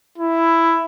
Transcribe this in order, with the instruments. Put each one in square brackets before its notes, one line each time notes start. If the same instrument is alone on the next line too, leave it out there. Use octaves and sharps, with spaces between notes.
[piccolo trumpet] E4